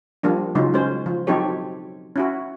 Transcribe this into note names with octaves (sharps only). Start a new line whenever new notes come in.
F3 G3 A#3 D4
C#3 F#3 G#3 D#4 F4
G#3 C#4 C5
F3
F#3 C4 D#4 G4 A4 C#5
C#4 E4 F#4